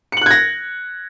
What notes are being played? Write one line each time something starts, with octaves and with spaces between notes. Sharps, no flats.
F#6 G#6 A#6 C#7 F#7